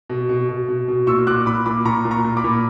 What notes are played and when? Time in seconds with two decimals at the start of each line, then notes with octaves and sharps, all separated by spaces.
0.10 B2
0.29 B2
0.49 B2
0.68 B2
0.88 B2
1.07 A#2 C#6 E6
1.27 A#2 D6 F#6
1.46 A#2 B5 D6
1.66 A#2 B5 D6
1.85 A#2 A#5 C#6
2.05 A#2
2.11 A#5 C#6
2.24 A#2
2.37 B5 D6
2.44 A#2